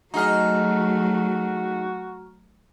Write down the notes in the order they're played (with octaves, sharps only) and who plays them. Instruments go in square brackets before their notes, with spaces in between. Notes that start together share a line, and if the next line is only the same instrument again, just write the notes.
[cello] F#3 A3 [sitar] D#4 G#4 D#5 [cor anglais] F#4 [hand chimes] A#5 F6